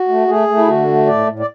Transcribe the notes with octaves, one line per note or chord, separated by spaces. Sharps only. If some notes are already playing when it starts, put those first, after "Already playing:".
Already playing: F#4
A3
A3 G#4
A3
E4
D3 F#4
A3
A2 D5
A2
D5